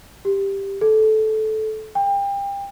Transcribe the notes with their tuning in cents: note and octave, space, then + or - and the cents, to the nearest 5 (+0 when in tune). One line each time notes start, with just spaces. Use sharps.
G4 +5
A4 -15
G5 +30